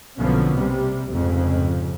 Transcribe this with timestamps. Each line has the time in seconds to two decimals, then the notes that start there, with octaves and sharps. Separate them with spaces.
0.18 B1 D3 F3 A#3 B3 C#4
0.57 C3 G3
1.09 F1 F2 G#2 C#3